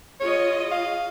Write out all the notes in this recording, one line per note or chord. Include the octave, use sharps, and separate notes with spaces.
F4 G#4 C#5 D#5
F5